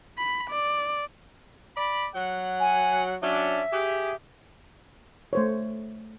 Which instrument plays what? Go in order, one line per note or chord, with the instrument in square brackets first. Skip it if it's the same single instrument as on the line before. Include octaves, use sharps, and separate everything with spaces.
[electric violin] B5
D5
[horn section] D5 B5
F#3 F#5
[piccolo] G#5
[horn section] F#3 C#4 D4 [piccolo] E5
[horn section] G4 G#4
[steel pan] A3 C5 C#5